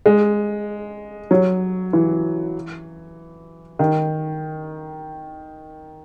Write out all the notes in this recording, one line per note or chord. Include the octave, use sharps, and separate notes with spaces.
G#3
F#3
E3
D#3